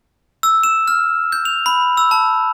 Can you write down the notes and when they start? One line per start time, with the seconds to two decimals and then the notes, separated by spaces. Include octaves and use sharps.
0.43 E6
0.63 E7
0.88 F6
1.32 G6
1.45 F7
1.66 B5
1.97 E6
2.11 A5